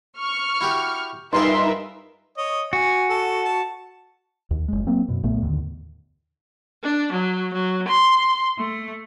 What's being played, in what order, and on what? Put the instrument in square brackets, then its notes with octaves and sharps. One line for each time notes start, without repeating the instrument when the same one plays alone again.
[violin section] C#6 F6
[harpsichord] E4 F#4 G4
[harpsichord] G2 F4 G#4 [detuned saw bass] D#4 [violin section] A#4 B4 E5 [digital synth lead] C6
[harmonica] C#5 D#5
[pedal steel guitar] F#4 [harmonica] G#5
[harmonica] A4
A5
[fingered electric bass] D#2
F#1 G#3
F#3 A#3 C4
F#2 B2
B1 A#2 A3 B3
D#2 A2 D3 D#3
[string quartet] D4
F#3
F#3
C6
A3